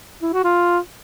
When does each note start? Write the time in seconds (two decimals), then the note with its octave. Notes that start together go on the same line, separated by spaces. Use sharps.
0.22 E4
0.33 F#4
0.44 F4